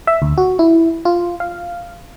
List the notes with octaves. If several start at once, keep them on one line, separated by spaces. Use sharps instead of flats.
E5
D2
F#4
E4
F4
F5